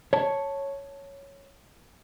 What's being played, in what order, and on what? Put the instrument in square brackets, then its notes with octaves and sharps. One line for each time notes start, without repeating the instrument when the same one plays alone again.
[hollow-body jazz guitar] C#5 A5